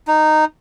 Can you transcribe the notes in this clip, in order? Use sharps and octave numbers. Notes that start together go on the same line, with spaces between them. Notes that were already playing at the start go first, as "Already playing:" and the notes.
D#4